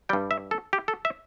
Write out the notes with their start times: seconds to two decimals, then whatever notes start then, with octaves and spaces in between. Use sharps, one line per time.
0.09 G2 G3 G5
0.31 E5
0.51 A4
0.73 G4
0.88 A4
1.05 E5